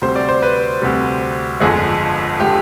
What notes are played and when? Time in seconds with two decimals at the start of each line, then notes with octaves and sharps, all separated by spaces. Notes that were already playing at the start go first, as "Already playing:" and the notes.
0.02 D2 C3 G3 C5
0.16 D5
0.29 C5
0.43 B4
0.82 D2 C3 G3
1.60 G1 F2 D3 G#3 G#4
2.40 D3 G#3 G4